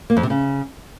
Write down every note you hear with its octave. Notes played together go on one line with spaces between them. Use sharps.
A#3
F2
C3
C#3